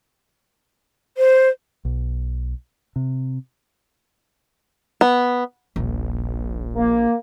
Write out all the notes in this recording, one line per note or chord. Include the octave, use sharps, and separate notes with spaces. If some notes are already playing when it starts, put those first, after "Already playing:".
C5
B1
C3
B3
D#1 A#1
A#3